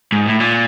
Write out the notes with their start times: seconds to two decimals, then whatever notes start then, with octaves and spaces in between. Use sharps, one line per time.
0.12 G#2
0.26 A2
0.40 A#2